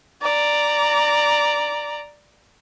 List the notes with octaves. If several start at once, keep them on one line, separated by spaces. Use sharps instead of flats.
D5 A#5